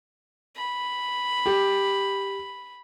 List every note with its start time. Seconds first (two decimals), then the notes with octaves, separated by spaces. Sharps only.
0.56 B5
1.46 G4